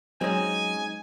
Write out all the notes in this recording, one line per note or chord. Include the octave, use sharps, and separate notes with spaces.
F#3 G#3 C4 C#4 D#4 D#5 G#5